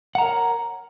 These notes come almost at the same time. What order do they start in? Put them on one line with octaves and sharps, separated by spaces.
F#5 A#5 A#4 C#5